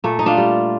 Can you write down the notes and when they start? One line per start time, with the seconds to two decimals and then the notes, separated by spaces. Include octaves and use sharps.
0.04 A#2 A3
0.19 D#4
0.26 D4 F4
0.37 G3